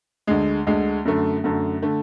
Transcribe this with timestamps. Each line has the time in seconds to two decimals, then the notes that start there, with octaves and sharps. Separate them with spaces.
0.27 D2 D3 G#3
0.67 D2 D3 G#3
1.05 F#2 D3 A3
1.44 F#2 D3 A3
1.82 D3 A3